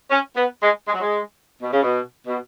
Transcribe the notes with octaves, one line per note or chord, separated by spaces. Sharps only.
C#4
B3
G#3
G#3
F#3
G#3
B2
C#3
B2
B2